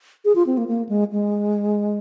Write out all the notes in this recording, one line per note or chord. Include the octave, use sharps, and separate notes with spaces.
G#4
F4
C4
A#3
A#3
G#3
G#3